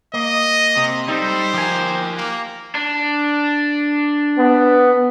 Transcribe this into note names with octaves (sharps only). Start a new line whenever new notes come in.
A#3 D#5
C3
G3 D#4 A4 C5
F3 G4 A#4 G#5
A#3
D4
B3